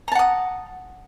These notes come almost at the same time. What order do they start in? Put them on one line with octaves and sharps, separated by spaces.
A#5 A5 F#5 D#6